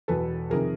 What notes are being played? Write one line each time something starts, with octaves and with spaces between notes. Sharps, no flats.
E1 E2 B2 A4 B4
F2 C3 D#3 G#4 A#4